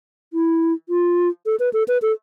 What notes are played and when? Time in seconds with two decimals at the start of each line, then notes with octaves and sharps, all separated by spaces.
0.33 E4
0.89 F4
1.46 A4
1.60 B4
1.73 A4
1.88 B4
2.02 A4